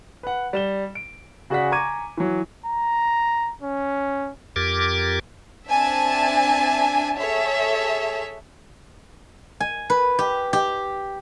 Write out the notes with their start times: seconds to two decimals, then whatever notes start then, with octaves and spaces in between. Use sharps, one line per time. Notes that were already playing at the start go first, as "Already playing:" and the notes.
0.23 B4 F#5
0.53 G3 E7 G7
0.95 D7
1.50 C#3 F#4 G#4 D5 F#5 B6
1.72 G#5 A#5 C#6 D6 G#6 D#7
2.17 E3 F#3
2.66 A#5
3.62 C#4
4.56 F2 G4 A#4 D6 G#6 A6
5.68 C4 D4 E5 G#5 A5
7.17 G#4 A4 C#5 E5
9.60 G#5
9.90 B4
10.19 G4
10.53 G4